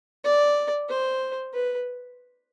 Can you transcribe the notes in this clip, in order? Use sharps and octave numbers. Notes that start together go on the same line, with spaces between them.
D5
C5
B4